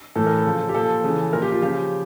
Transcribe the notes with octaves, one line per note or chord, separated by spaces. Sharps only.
A2 E3 A4
A#4
A4
C#3 F3
G4
A#2 F3 A4
C#3 E3
A#2 F3 A#4
G4
F4
C#3 F3 G4